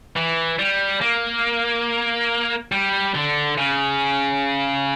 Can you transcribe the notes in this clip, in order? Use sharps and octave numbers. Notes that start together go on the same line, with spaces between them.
E3
G3
A#3
G3
D3
C#3